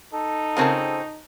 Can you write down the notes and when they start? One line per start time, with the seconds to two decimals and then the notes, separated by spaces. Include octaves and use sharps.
0.13 D#4 A4
0.57 C#3 C4 F4 G#4 A#4 A5